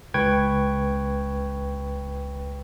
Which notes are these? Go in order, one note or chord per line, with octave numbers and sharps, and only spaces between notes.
C#2 B4 G5 C#6 G#6